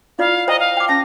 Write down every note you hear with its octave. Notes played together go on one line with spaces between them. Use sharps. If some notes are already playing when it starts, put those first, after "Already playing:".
E4 F4 D5 F5
C5 D#5 G5 A#5
F5
G5 D6
C#4 F5 A5 A#6